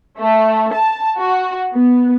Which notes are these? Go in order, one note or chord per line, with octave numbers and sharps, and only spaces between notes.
A3
A5
F#4
B3